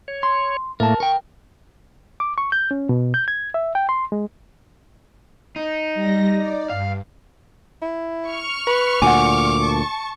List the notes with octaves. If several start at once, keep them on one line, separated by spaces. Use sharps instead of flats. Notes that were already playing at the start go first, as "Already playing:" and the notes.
C#5
C6
A2 A3 A#3 A#4 A5
A#4 G5 C#6
D6
C#6
G6
C#4
B2
G6
G#6
E5
G5
C6
G#3
D#4
G3 A#6
D5
G2 F5
E4
C#6 F6
B4
D2 A#2 F#5 G#5 D6
A5 C#6